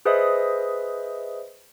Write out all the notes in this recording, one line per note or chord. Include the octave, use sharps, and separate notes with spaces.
G#4 B4 C5 D#5 E5 D#6